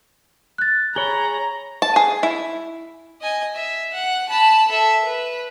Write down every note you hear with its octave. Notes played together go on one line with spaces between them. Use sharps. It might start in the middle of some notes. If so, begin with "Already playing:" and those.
F#6 A6
G#4 C#5 A#5 B5 G7
A5
G#4
E4
D#5 G#5
E5
F#5
A5 B5
A4 E5
B4